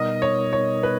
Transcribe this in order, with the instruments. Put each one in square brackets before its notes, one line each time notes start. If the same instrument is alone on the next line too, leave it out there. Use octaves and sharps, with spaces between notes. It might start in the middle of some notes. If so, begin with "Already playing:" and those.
Already playing: [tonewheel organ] B2 G3 B3 D#4 A#4 [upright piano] D#5
[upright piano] C#5
C#5
B4